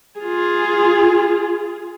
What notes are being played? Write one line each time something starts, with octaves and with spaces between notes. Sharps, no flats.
F4 G#4